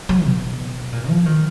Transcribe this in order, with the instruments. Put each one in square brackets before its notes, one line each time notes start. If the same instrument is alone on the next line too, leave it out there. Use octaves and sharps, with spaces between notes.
[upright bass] F#3
B2
A#2
F3
D#3